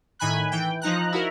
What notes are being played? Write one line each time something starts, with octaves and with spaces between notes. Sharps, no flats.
A2 D#3 G#5 B5 F#6
E3 G5
F3 D#4 A#5 F#6
E4 F#4 A#4